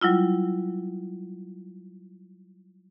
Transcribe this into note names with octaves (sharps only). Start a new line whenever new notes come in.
F#3 G3 E4 F4